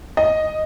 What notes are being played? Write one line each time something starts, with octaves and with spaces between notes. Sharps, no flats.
D#5